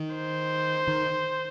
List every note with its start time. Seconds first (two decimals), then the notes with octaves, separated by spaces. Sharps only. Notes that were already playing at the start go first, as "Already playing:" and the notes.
Already playing: D#3
0.15 C5
0.88 D#3